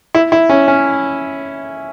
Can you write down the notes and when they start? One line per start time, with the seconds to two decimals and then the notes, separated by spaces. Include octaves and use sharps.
0.15 E4
0.32 E4
0.49 C#4
0.68 C#4